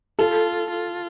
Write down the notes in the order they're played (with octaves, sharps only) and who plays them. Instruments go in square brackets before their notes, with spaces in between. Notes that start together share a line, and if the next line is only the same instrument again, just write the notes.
[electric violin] F4 [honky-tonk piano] A4
[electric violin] F4